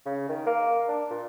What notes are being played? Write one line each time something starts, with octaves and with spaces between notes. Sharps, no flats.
C#3
D#3
A#3
D4
A#2